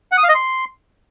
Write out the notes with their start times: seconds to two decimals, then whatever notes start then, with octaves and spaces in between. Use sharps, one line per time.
0.12 F#5
0.18 D#6
0.23 F5
0.29 D#5
0.35 C6